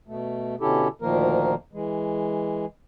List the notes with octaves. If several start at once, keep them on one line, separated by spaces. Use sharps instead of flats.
B2 A3
B2 D3 C#4 E4 G4 A4
D2 A#2 D#3 F3 A#3 A#4
E3 G#3